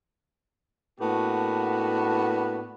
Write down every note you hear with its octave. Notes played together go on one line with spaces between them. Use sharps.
A2 A#3 B3 D4 F#4